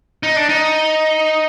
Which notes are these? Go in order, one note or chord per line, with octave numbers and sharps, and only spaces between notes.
D#4
D4
D#4